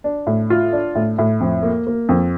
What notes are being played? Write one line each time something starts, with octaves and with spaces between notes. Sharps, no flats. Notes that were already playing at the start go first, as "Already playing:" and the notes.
D4
A2
F4
D4
A2
A2
F2
A#3
A#3
F2